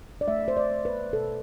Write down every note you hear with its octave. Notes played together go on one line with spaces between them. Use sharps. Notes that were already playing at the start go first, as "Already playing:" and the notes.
D5
A3 E5
C5
D5
A3
B4
B2 A4